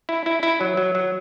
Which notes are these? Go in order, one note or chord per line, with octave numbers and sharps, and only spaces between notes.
E4
E4
E4
F#3
F#3
F#3